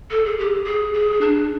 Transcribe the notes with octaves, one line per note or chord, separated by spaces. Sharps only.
A4
G#4
G4
G#4
G#4
D4